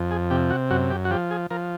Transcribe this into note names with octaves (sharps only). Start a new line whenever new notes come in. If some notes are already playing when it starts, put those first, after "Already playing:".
Already playing: F2
G#4
C3 G4
F#4
F#2 F#4
G4
F#4
F3 G4
G#4
F3 A#4